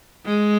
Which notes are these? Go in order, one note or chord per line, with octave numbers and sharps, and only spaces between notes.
G#3